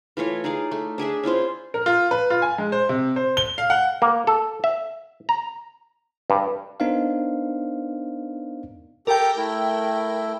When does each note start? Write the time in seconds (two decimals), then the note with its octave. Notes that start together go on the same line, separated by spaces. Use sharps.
0.17 E3 A3 F4 C#5
0.44 D#4 G#4 D5 F5
0.71 A3
0.98 D4 G#4 E5 A5
1.23 C#4 E4 F4 C5
1.74 A#4
1.86 F4
2.11 B4
2.30 F4
2.42 G#5
2.58 G#3
2.72 C5
2.89 C3
3.16 C5
3.37 G7
3.58 F5
3.70 F#5
4.02 A#3
4.27 A4
4.64 E5
5.29 A#5
6.30 G2
6.80 B3 D4 D#4 A#4 C5 F5
9.07 G4 A4 A#4 G5 D6
9.37 A3 E4